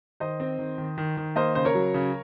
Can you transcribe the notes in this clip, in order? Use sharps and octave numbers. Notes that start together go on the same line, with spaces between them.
D#3 C5 D#5
C4
D#3
D#3
D#3
D#3
A#3 C5 D#5
C#3 C5
A#4 C#5
F#3
C#3